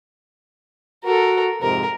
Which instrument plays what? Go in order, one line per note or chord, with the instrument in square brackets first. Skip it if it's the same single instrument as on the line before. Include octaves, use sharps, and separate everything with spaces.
[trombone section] F#4 [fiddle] A4 A#4
[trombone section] F2 G#2 C3 [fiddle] A#4